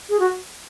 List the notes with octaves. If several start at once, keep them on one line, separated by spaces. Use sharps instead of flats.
G#4
F#4